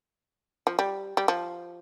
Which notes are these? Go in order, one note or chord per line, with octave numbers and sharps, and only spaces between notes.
F3
G3
G3
F3